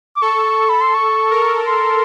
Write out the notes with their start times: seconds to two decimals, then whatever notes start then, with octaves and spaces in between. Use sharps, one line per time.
0.16 D6
0.22 A4 C#6
0.69 B5
0.81 C6
0.94 C#6
1.31 A#4
1.67 C6